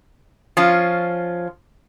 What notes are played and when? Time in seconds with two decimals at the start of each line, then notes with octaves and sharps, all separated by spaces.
0.57 F3 C#4 F4